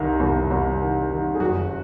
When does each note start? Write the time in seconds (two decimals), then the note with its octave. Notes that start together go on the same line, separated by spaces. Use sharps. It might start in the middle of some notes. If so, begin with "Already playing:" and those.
Already playing: C2 D#3
0.20 C2
0.50 C2
0.81 D#3
1.10 D#3
1.35 G#4
1.40 F#1 F#4